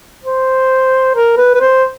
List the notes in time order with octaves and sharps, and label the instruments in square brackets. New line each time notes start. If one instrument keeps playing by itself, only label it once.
[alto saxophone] C5
A#4
B4
B4
C5